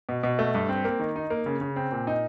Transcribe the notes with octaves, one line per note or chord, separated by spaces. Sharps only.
B2
B2
A3
G2
C4
A#3
D#3
D#4
A#3
C#3
C#3
C4
A#2
D#4